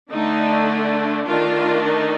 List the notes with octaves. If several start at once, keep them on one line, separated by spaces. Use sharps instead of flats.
D3 A3 D4 D#4
D#3 A3 D4 F4
D#4